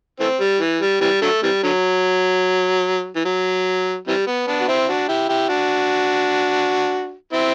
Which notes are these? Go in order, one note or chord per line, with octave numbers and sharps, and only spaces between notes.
E3 A3 C4
G3
E3
G3
C3 E3 G3
D3 F#3 A3
C3 E3 G3
D3 F#3
E3
F#3
C3 E3 G3
B3
B3 D4
F#4
C4 E4
D4 F#4
E4 G4
E4 G4
D4 F#4
C4 E4